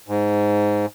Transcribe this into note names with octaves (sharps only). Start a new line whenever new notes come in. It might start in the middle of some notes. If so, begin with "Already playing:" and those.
G#2